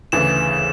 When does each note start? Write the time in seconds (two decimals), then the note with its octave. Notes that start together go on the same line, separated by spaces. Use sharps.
0.12 D2 C#3 E3 E7